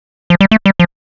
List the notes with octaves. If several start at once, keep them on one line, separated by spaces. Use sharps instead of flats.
F3
G3
A3
G3
F3